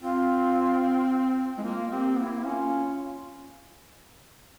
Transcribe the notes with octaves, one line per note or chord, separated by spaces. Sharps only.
C4 F4
G#3 E4
A#3 F4
C4 G4
A#3 E4
E4
C#4 F4